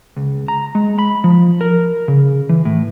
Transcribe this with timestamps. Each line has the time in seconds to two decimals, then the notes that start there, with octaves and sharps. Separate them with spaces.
0.17 C#2
0.48 A#5
0.75 G#3
0.99 B5
1.24 F3
1.61 A#4
2.08 C#3
2.49 E3
2.65 A2